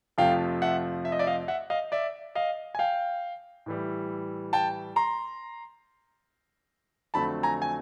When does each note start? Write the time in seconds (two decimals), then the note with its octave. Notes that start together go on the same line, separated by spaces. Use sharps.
0.18 F2 C3 F3 A3 F5 G5
0.62 E5 F#5
1.05 E5
1.12 D#5
1.19 D5 E5
1.27 D#5 F5
1.48 E5 F#5
1.70 D#5 F5
1.92 D5 E5
2.35 D#5 F5
2.75 G#5
2.79 F5 G5
3.66 A2 E3 G3
4.53 G5 A5
4.96 A#5 C6
7.14 F2 D3 F#3 A3 C4 A5 B5
7.43 G#5 A#5
7.62 G#5